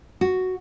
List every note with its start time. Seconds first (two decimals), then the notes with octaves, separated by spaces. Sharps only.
0.21 F#4